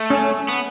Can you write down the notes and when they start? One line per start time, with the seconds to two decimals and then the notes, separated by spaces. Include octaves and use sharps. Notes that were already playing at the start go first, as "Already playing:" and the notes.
Already playing: A3
0.10 C#4
0.48 B3